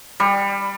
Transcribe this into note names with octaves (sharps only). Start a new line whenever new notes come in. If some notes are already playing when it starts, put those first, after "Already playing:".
G3